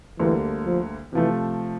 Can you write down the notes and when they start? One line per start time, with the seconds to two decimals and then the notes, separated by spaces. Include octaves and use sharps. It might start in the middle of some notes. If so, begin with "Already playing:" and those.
0.19 D2 D3 E3 G3 A#3
0.66 F3
1.13 C3 E3 F3 A3